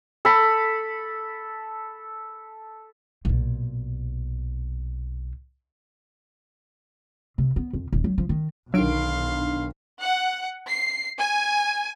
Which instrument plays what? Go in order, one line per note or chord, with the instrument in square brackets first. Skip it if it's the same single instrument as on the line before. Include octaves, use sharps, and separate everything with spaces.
[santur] A4 B5
[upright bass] B1 A#2
C3
B3
F2
D#1
F#3
F3
D#3
[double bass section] B1 [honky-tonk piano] D3 D#3 [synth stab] F#3 D7 [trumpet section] F5 C6
[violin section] F#5
C7
G#5